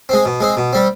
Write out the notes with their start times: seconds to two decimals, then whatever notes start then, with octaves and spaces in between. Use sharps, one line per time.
0.09 G#3 C4
0.25 B2
0.40 G#3 C4
0.57 B2
0.73 G3 C4